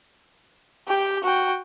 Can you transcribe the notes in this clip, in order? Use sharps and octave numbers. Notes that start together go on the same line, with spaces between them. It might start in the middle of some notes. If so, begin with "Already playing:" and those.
G4 G5
F#4 G5